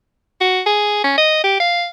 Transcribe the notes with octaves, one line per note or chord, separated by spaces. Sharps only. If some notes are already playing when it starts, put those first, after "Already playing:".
F#4
G#4
C#4
D#5
G4
F5